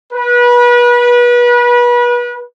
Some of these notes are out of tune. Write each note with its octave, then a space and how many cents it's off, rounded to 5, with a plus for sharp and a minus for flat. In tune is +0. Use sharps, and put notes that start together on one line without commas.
B4 -30